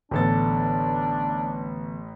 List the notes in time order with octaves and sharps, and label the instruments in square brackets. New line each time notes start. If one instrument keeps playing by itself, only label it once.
[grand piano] A1 A4 A6 [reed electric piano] D3 E3 B3 [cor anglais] D4